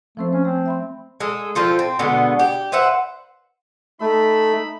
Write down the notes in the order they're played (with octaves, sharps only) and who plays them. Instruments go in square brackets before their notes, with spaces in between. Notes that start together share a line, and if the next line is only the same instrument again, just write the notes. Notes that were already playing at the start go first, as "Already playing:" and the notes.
[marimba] F3 C4 C5 [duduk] A3
[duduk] C#4 [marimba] C5
[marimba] A3 [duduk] C4
[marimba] E5 B5 C6
[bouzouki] G#3 A4
F3 C4 F4 A4
C4
B2 D3 G#3 B3
G4
B4 C5 E5 F#5
[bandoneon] A3 [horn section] D#4 E5 B5